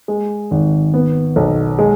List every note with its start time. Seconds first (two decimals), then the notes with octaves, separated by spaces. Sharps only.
0.08 G#3
0.51 G#1
0.94 B3
1.36 B1
1.79 G#3